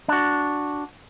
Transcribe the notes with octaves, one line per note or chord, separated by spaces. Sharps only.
D4 F#4